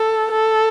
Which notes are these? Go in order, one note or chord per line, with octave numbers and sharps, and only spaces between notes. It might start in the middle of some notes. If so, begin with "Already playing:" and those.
Already playing: A4
A4